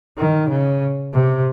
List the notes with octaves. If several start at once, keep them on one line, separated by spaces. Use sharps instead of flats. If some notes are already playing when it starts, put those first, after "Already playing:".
D#3
C#3
C3